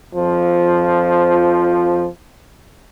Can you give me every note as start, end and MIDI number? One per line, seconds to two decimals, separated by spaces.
0.15 2.05 41
0.15 2.05 53